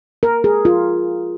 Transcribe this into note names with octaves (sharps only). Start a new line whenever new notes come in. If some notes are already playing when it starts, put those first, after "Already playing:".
A#4
G#4
F4